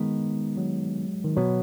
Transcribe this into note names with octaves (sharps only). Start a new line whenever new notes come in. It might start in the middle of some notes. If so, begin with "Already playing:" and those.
Already playing: D#3 G#3 B3
F#3
D#3
B2 F#3 B3